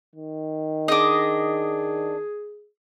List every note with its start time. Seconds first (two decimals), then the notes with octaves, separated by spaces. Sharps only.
0.15 D#3
0.88 D4 G#4 D#5